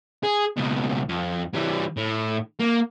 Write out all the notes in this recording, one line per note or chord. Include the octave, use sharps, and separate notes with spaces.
G#4
C#2 B2
F2
E3 G3
A2
A#3